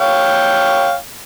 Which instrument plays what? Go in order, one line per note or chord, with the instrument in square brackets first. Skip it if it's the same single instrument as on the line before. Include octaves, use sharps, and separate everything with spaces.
[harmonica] C#5 F5 G5